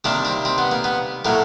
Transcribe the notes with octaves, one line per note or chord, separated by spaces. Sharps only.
C3 D#3 G3 A#3 D4
C4
C4
B3
A#3
B3
A2 F#3 A#3